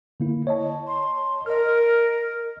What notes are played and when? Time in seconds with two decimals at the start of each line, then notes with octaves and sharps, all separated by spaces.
0.20 D3 A#3 E4
0.47 C#5 D#5 A5
0.87 C6
1.46 A#4 D#5 F6